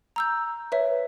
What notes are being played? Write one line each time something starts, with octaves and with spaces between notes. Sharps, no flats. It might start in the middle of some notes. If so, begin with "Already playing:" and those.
A#5 E6 G6
B4 C#5 E5